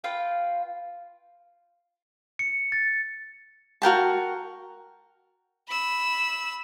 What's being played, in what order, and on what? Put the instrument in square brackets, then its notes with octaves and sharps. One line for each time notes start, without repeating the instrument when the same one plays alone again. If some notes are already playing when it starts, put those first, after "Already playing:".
[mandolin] F4 B4 F5 G5
[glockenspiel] C#7
A6
[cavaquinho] F#4 A#4 G5 A5
[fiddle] B5 E6